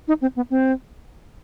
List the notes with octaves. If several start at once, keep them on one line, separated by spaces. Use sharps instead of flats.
D#4
C4
B3
C4